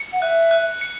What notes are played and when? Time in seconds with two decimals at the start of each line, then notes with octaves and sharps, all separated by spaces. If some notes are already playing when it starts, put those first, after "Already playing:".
Already playing: C#7
0.13 F#5
0.21 E5 F#6
0.51 F#6
0.81 C#7